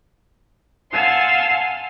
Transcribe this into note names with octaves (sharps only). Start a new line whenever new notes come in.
F5 F#5 G#5 A5 C6 E6